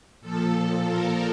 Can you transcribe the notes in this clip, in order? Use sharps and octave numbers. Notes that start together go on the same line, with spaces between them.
A#2 F3 A4
A#4